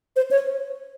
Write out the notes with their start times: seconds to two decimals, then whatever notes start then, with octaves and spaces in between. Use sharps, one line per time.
0.16 C5
0.31 C#5